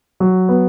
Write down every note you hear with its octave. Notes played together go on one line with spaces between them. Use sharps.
F#3
B3